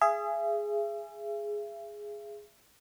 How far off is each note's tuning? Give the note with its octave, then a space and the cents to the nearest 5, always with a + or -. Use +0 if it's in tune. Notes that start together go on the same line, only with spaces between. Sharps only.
G#4 +0 E5 +40